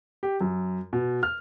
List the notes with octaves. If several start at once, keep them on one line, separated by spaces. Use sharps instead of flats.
G4
F#2
B2
F6